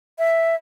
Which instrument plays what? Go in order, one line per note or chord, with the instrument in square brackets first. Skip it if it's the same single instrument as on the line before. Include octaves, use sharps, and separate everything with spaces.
[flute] E5